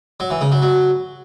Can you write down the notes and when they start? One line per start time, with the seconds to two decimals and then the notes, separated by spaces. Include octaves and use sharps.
0.20 F#3
0.31 E3
0.41 C#3
0.52 F#3
0.62 F#3